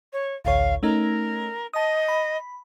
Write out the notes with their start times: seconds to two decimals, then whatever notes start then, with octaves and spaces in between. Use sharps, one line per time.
0.13 C#5
0.45 A1 D2 C#5 F5
0.83 A3 C#4 D#4 A#4
1.74 D#5 A5 D#6
2.08 B5